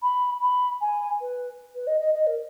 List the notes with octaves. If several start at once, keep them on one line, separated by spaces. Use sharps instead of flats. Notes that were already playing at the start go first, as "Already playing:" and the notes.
B5
B5
G#5
B4
B4
D#5
D#5
D#5
A#4